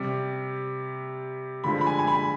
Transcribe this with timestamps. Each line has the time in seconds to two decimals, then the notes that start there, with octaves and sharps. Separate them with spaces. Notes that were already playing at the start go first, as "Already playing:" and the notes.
Already playing: C3 G3
1.64 D3 F3 G#3 B5
1.81 B5
1.87 G#5
1.99 G#5
2.07 B5